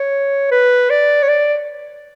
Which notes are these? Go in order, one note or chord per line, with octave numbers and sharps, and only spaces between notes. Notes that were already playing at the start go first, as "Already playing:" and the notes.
Already playing: C#5
B4
D5
C#5
D5